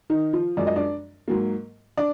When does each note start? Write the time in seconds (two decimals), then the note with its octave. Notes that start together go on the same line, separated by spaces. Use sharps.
0.10 D#3 D#4
0.33 F3 F4
0.57 F#2 F3 G#3 D5
0.67 D#5
0.76 D4 D5
1.28 G#2 F#3 A#3
1.97 D4 D5